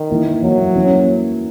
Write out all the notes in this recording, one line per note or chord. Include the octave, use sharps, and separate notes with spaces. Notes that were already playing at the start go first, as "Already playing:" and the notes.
Already playing: D#3
E3 A#3 E4
E3 F#3 A#3 E4
E3 A#3 C#4 E4